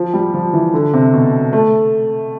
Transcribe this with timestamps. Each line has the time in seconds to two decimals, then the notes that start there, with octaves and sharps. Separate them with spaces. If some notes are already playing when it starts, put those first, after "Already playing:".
Already playing: F3
0.14 G3
0.34 F3
0.53 E3
0.74 D3
0.93 C3
1.14 B2
1.53 A3